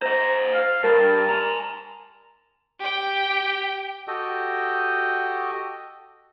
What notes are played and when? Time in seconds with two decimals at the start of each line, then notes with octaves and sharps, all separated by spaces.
0.02 C5 D#5 A#5
0.54 F5
0.84 G2 A#4 A5
1.29 G#5 A#5
2.80 G4 G5
4.08 F#4 G4 A4 D#5 G5